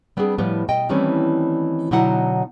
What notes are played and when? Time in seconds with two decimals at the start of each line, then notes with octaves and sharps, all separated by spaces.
0.17 G3 B3 C4 D4 G#4
0.38 A2 F3 G3 B3
0.69 B2 D#5 G5
0.89 D#3 E3 G3 A3 C4 C#4
1.91 B2 D3 F#3 D#4 E4 F#5